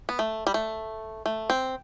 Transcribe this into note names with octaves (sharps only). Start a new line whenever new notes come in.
B3
A3
G3
A3
A3
C4